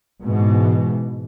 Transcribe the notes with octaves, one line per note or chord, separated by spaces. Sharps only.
G#2 B2 E3